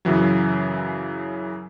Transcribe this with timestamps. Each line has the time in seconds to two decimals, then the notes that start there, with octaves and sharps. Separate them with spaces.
0.05 F#2 C#3 E3 F#3